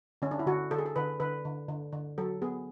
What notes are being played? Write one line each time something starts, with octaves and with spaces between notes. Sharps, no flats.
D3 C#4
D4
E4
D3 F#4
D3 A4
G#4
A4
D3 B4
D3 B4
D3
D3
D3
F#3 A4
B3 G#4